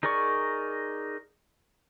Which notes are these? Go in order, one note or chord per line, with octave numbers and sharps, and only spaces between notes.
D#4 G#4 A#4 D5 C#6